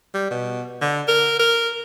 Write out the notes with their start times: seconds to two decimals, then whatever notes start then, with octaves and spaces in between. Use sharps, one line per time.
0.14 G3
0.31 B2
0.81 D3
1.08 A#4
1.39 A#4